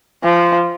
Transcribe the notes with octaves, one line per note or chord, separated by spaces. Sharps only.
F3